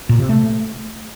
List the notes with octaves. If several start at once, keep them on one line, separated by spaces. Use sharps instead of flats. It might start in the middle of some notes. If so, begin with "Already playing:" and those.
A#2
C3
A3